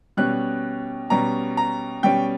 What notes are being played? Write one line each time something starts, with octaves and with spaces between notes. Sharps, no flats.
B2 G3 C#4 F#6
B2 G3 C#4 A#5
A#5
B2 G3 C#4 G5